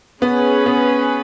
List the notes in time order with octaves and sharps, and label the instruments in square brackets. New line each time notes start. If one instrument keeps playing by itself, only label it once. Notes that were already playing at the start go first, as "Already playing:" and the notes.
[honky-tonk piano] B3 [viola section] C#4 G#4 B4
[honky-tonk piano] B3